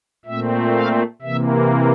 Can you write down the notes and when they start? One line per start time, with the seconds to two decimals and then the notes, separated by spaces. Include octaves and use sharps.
0.25 A#2 A3 C4 E5
0.73 F5
1.22 C3 E3 A#3 E5